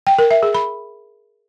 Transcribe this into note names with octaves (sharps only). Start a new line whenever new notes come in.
G5
A#4
E5
G#4
B5